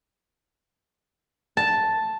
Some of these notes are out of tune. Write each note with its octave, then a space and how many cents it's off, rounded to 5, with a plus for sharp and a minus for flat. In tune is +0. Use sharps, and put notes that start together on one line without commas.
A5 +0